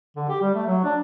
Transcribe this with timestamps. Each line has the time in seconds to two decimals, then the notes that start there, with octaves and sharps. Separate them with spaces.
0.16 D3
0.29 G4
0.41 G3
0.54 A3
0.67 F#3
0.84 D4